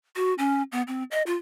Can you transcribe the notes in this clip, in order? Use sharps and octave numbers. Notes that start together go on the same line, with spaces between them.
F#4
C#4
B3
C4
D#5
F4